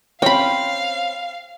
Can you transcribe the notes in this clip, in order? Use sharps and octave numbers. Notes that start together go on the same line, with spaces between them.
C4 C#4 F5 G5 B5